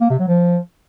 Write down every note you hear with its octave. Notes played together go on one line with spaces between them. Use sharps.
A#3
C3
F#3
F3